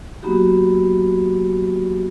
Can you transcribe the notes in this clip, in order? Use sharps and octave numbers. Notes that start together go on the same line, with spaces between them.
F#3 A#3 B3 D#4 F#4 G4